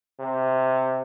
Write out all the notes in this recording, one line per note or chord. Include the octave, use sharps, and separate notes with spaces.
C3